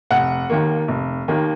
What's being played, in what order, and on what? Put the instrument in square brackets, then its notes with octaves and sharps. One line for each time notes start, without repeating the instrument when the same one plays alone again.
[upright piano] F1 F#5
D#2 D#3 A#3
F1
D#2 D#3 A#3